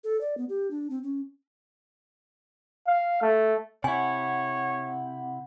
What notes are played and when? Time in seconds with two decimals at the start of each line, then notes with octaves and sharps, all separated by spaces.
0.04 A4
0.21 D5
0.38 B3
0.49 G4
0.71 D4
0.90 C4
1.03 C#4
2.87 F5
3.22 A3
3.84 C3 E4 C#5 F#5 G#5